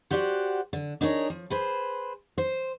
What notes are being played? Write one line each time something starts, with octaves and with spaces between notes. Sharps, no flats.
F#4 G4 C5 D5 F5 F#5
D3
D4 D#4 G#4 A#4 C#5
F3
G#4 B4 C5
C5